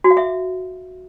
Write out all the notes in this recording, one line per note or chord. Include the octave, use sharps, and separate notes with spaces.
F#4
F5
E5